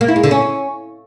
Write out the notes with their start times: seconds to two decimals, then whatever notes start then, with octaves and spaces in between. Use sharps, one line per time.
0.01 A#3
0.08 E4
0.16 G#3
0.23 D3
0.31 C#4